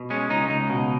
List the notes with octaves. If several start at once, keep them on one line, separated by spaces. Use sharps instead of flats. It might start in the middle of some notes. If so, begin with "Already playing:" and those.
Already playing: B2
G#3 C#4
C#2 D#4
C#2 D#4
B2